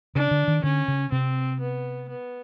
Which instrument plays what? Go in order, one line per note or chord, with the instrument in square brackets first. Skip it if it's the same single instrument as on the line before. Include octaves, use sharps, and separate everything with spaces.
[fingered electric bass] C#3 [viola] D4
[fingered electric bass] D3
D#3
[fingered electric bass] D3 [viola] C#4
[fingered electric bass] C#3
[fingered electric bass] C3 [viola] C4
[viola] B3
B3